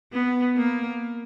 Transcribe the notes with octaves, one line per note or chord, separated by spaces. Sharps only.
B3
A#3